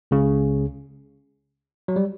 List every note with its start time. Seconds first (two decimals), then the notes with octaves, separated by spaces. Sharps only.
0.11 C#2 C#3
1.88 F#3
1.96 G3